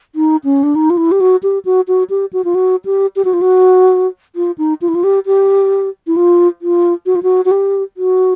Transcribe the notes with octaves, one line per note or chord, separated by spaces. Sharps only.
D#4
C#4
D4
D#4
F4
E4
G4
F#4
G4
F#4
F#4
G4
F#4
F4
F#4
G4
G4
F#4
F4
F#4
F4
D#4
F4
E4
F4
G4
G4
E4
F4
F4
F#4
F4
F#4
F#4
G4
F#4